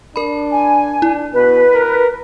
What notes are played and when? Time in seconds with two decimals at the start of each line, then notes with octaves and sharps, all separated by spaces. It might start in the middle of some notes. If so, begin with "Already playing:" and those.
0.16 D4 A#4 B5
0.51 G#5
1.02 D4 E4
1.34 B2 B4
1.74 A#4